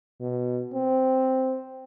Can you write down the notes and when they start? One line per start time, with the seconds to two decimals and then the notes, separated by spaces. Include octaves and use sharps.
0.21 B2
0.74 C4